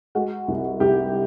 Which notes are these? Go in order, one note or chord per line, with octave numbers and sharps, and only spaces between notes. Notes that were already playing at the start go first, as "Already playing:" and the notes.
G#3 F#4
C2
C2 G4